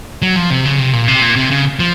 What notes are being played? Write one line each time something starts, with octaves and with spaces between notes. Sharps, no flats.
F#3
F3
C3
C#3
C3
A#2
C3
A#2
C3
C#3
F3